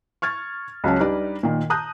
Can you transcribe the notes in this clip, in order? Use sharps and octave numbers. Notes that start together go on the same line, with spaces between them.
C#6 F6 G#6 A6
C#2 F#3 C#4 A5
G3 D4 D#4 G4 B4 D5
A#2 D#3
A5 A#5 D#6 F#6 G6